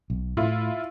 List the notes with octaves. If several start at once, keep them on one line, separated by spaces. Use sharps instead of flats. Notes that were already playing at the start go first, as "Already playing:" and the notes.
B1
A2 E4 F4